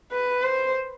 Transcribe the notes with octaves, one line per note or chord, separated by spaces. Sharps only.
B4
C5